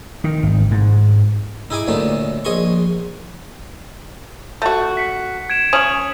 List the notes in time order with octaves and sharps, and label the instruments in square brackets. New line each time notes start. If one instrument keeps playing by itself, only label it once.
[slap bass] D#3
G#1
G#2
[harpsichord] D#4 E4 G#4 G#5 D6
D2 A#2 F#3 A3 D#4
A#1 G#4 D#5 C6 C#6
[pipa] A3 F#4
[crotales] B6 C#7
G#6 D7 E7
[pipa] C#4 C#5 [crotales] D#6 G#6 F#7